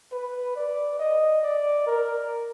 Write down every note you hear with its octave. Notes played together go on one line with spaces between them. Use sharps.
B4
D5
D#5
D5
A#4